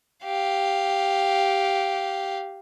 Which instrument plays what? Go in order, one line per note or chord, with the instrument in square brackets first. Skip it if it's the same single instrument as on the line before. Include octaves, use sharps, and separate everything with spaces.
[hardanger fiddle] G4 F5